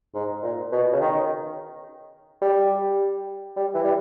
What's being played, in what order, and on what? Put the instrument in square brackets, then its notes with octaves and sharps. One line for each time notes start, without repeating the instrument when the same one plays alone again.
[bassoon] G#2
A#2
B2
C#3
D#3
G3
G3
E3
G3